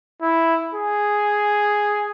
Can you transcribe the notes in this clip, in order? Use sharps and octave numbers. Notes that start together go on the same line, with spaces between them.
E4
G#4